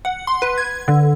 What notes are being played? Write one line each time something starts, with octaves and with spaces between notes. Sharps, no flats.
F#5
C6
B4
G#6
D3